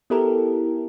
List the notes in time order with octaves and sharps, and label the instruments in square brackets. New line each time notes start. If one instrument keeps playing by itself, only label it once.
[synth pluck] B3 E4 G4 A4 A#4